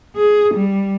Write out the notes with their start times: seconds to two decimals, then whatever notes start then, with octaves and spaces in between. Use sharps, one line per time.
0.17 G#4
0.55 G3